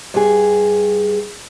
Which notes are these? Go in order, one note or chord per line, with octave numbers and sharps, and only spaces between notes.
G2 G#4